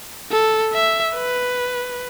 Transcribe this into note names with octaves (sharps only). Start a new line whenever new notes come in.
A4
E5
B4